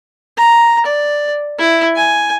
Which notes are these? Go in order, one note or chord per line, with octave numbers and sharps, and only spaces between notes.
A#5
D5
E4
G#5